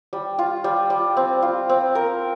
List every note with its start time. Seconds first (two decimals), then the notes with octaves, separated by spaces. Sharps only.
0.13 G3
0.39 F4
0.64 G3
0.90 G3
1.17 C4
1.42 F4
1.69 C4
1.95 A#4